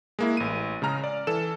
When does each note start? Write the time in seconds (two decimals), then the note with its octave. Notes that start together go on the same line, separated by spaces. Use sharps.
0.19 G#3 A#3 E4
0.37 A1 D#7
0.82 C#3 G#3 A#5 F6
1.04 D5
1.27 E3 A4 E7